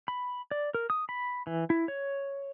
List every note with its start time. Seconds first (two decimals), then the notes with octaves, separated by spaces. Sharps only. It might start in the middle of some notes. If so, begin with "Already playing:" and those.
0.08 B5
0.51 D5
0.74 A#4
0.90 D#6
1.09 B5
1.47 E3
1.70 E4
1.88 C#5